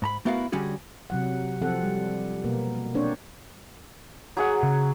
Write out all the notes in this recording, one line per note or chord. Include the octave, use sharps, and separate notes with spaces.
G#2 A#5 B5
A3 B3 E4 F#4 A#4 F5
D3 G3 C#4 F#4 G#4
C3 F#3 F#5
F3 C4 A4 F#5
G3
B2 A#3 B3
A#3 C4 D4 C5 C#5
F#3 G#4 F#5
C#3